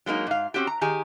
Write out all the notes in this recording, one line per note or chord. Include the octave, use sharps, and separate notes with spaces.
F#3 G#3 A#3 D#4
G#2 F5
C4 C#4 F#4 G4
A#5
D#3 G4 G#4 G#5 A#5